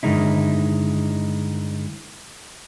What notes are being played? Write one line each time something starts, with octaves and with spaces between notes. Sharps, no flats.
G2 D3 D#3 G#3 D#4 E4